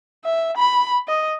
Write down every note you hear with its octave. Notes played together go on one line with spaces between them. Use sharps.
E5
B5
D#5